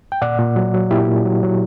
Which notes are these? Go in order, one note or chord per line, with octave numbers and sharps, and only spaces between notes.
G5
A#2 D5 F#5
A#2
F#3
F#3
A#2 E4 G4
A#2
F#3
F#3